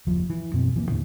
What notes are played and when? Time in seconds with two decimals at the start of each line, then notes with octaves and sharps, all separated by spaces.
0.07 F#1 D#2 F3
0.30 E3
0.54 F#2 B2 C4
0.74 D1 E3 A#3
0.90 D#2 A2 D3 E3